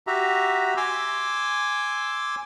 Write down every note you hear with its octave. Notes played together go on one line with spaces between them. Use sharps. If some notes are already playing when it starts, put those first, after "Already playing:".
F#4 G4 E5 A#5
G#5 C6 D6 E6